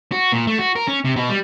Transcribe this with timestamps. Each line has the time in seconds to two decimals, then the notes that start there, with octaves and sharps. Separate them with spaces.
0.12 F#4
0.32 A#2
0.47 A3
0.58 F#4
0.76 A#4
0.87 C#4
1.05 C3
1.16 B2
1.29 G3